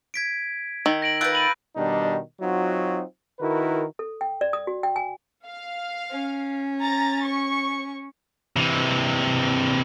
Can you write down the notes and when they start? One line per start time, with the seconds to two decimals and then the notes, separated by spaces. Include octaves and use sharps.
0.14 G#6 B6 D7
0.86 D#3 A#5 E6
1.02 A#6 D7 F#7
1.21 F4 B4 E6 F#6 G6 D7
1.35 A6 D#7 F#7
1.76 B2 D#3 G3 D4 D#4
2.41 F#3 C4 D#4 F4 F#4
3.40 D#3 E4 F#4 A#4 B4
3.99 A4
4.21 G5
4.41 D5
4.53 D#6
4.67 F#4
4.83 G5
4.96 G#5
5.46 F5
6.11 C#4
6.81 A#5 A6
7.26 C#6
8.56 C3 E3